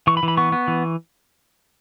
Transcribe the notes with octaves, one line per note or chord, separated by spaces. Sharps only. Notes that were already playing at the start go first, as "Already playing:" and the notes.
E3 C#6
B5
E3
B5
B3 C#6
B3
E3